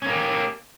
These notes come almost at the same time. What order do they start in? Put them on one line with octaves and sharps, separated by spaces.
C#4 A#3 G4